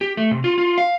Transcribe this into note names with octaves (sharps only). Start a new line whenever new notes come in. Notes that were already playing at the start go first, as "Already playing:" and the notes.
G4
A3
C3
F4
F4
F5